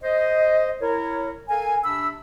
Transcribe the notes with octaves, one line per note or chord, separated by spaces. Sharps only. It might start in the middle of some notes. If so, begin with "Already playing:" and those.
C5 D#5
E4 A#4 C#5
A4 A#4 F5 G#5
C3 D4 B5 E6